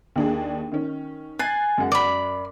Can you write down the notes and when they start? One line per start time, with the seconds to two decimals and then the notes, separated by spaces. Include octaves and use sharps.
0.16 D#2 D4 G#4
0.72 D#3 C#4
1.39 G#5 F#6 A6 C7
1.78 F#2 G#3 F#5
1.92 F#2 D5 B5